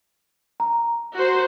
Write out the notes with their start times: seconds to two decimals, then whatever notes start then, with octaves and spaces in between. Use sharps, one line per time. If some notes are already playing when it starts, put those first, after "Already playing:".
0.60 A#5
1.14 F#4 C5